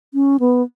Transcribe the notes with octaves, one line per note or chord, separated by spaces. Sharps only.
C#4
B3